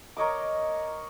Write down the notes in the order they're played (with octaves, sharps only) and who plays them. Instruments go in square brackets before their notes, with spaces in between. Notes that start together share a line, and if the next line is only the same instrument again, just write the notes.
[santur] A#4 C#5 D#5 D6